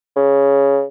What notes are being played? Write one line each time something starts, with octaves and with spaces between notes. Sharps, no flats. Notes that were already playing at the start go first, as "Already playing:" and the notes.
C#3